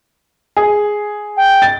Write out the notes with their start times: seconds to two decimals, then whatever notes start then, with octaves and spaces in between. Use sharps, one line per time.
0.57 G#4
1.37 G5
1.62 A6